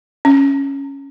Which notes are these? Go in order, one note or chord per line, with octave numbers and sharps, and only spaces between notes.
C#4